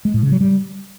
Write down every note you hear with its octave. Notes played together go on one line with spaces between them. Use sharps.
G#3
A2
C#3
F#3
G3